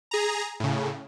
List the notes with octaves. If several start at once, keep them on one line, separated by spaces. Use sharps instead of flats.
G#4 A#5
A2 C#3